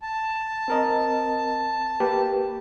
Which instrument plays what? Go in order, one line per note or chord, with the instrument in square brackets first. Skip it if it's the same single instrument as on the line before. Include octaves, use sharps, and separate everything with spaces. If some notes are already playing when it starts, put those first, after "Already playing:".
[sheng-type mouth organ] A5
[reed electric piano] C4 A#4 D#5
A#3 G4 B4